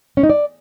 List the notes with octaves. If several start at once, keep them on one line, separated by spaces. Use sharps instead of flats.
C#4
D#4
D5